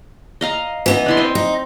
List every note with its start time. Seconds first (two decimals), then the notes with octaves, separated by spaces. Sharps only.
0.41 D#5 F5 A#5
0.86 E3 B3 D#4
1.06 D4 E4 C6
1.17 C4 D#5
1.35 D#4